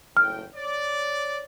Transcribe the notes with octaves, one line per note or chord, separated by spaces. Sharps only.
F#1 A2 G5 F6
C#5 D5